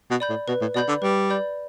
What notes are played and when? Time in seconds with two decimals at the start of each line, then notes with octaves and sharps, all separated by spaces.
0.11 B2
0.20 D5 B5 G6
0.29 A2
0.48 B2 B4
0.61 A2
0.74 B2 D5 B5 G6
0.88 D3
1.02 G3 B4
1.30 D5 B5 G6